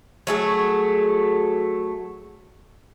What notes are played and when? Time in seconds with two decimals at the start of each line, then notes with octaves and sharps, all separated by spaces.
0.27 F#3 A3 G#4